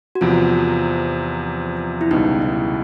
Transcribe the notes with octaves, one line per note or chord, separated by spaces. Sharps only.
F#4
E2 C3 F3 F4
E4
C#2 B2 G3 D#4
E4